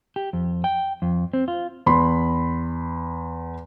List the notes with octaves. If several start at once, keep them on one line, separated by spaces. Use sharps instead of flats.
G4
F2
G5
F2
C4
F4
E2 B5 C6